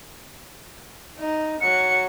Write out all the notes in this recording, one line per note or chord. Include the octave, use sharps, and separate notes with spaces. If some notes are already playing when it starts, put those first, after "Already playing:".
D#4
F#3 C#7